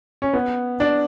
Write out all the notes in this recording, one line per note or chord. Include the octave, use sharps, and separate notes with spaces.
C#4
B3
D4